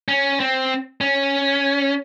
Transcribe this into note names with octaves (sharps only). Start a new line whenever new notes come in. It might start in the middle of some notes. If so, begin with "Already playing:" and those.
C#4
C4
C#4